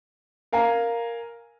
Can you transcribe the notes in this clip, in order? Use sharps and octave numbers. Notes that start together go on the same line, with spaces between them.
A#4 F5 G#5 A#5